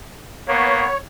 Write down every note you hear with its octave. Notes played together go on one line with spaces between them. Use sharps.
A#3 B3 C#5